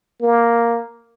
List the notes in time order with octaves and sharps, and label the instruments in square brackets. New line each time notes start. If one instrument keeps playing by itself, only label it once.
[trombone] A#3